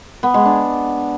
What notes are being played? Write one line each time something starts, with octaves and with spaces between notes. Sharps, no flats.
B3
G#3
D4